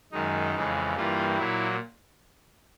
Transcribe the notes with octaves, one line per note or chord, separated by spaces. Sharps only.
F#2 D#3 G#3 D#4
F2 C#3 E3 G#3
G2 E3 G3 A#3 F4
A#2 F#3 A#3 E4